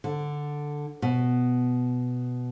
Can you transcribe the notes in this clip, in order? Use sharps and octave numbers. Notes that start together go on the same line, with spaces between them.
D3
B2